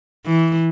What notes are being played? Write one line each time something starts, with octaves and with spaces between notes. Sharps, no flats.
E3